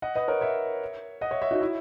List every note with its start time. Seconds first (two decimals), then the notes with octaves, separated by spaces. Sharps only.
0.02 D#5 F#5
0.15 B4 D#5
0.28 A#4 C#5
0.41 C#5 E5
1.21 D#5 F#5
1.31 C#5 E5
1.42 C#5 E5
1.51 D#4 F#4
1.61 E4